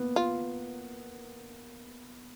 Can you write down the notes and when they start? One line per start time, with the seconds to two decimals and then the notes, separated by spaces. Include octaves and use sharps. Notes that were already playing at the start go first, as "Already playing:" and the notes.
Already playing: A#3 B3
0.16 F4